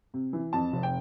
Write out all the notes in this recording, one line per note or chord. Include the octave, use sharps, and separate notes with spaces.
C3
E3
F2 A5
F1
G5